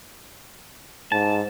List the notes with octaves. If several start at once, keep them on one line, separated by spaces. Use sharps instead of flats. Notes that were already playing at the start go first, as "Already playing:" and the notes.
G#2 A5